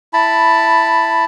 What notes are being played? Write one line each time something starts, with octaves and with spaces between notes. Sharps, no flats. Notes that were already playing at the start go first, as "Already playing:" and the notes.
E4 A5 B5